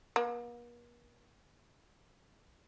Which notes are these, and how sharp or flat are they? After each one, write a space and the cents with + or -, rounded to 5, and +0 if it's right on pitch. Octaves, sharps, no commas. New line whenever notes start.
A#3 +45